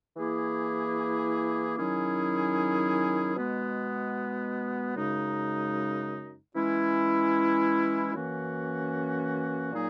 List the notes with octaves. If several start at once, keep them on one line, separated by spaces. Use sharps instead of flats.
E3 A#3 E4 G#4
D#3 F#3 C#4 E4 G#4
B2 G#3 B3
F#2 C#3 G#3 D#4
E3 G#3 C#4 E4
F#2 E3 A#3 C#4 F#4
A#2 F#3 A#3 D#4 G#4